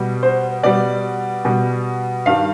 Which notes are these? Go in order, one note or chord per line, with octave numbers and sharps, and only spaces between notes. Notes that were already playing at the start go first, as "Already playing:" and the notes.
Already playing: B2 G3
C5
B2 G3 D5
B2 G3
G2 D#3 G3 F5